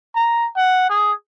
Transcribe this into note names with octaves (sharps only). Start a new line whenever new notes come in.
A#5
F#5
G#4